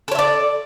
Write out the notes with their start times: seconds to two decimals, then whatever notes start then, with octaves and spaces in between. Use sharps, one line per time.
0.08 A4
0.12 C#5
0.15 E5
0.19 D5